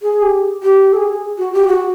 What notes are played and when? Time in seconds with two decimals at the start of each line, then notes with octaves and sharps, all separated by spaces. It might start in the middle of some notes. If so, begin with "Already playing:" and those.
0.02 G#4
0.22 G4
0.63 G4
0.93 A4
0.96 G#4
1.38 F#4
1.53 G4
1.68 F#4